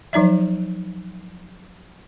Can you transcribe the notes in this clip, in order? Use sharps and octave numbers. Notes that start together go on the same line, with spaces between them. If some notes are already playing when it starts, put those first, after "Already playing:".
F3 F#3 D#4 D5 E5